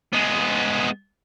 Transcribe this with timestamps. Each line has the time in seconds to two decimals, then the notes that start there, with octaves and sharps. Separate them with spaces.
0.13 G#3 B3